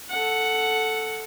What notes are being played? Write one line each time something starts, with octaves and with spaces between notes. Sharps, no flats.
A4 F#5